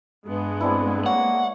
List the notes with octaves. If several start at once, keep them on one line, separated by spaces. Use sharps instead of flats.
G2 G#3 B3
C4 D4 E4
A#3 C#5 F#5